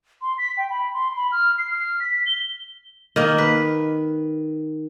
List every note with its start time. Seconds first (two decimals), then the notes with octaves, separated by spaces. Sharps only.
0.22 C6
0.38 B6
0.58 G5
0.70 B5
0.94 C6
1.16 B5
1.32 F6
1.58 C7
1.71 F6
2.00 B6
2.26 G7
3.16 D#3 A#3
3.38 B4